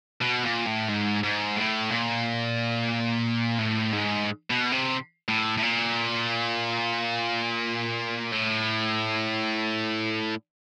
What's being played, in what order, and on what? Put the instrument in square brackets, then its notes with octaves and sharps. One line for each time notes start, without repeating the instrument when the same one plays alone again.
[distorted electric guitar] B2
A#2
A2
G#2
G#2
A2
A#2
A2
G#2
B2
C3
A2
A2
A#2
A2